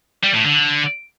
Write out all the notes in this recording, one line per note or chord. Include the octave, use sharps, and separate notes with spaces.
G3
A2
D3